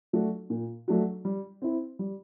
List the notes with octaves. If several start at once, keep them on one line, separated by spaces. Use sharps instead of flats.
F#3 A3 D4 F#4
A#2
F#3 A3 D4 F#4
G3
C4 E4
G3